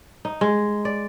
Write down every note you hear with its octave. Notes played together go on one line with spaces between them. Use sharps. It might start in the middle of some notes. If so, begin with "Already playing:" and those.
D#4
G#3
D5